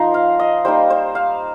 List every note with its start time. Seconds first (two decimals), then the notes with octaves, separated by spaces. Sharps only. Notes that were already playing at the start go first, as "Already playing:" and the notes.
Already playing: F3 D#4 A#5 C6
0.14 F5
0.39 D#5
0.65 G3 A#3 D#4 C5
0.90 C5
1.15 F5